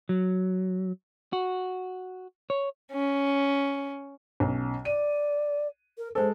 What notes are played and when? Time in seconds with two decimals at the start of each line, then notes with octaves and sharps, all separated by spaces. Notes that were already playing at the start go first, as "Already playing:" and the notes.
0.09 F#3
1.33 F#4
2.50 C#5
2.92 C#4
4.40 B1 C#4
4.85 D5 D#7
5.97 A#4
6.15 G#3 A4 C5